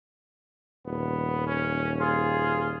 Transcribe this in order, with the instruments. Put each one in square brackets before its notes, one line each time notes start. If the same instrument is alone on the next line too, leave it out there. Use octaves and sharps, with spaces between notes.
[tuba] D#1 [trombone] B3
[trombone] C#4
[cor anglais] F4 [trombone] G#4